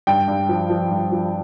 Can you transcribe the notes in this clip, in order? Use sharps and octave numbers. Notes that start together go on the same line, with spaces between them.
G2 G5
G2
F3
F3
G2
F3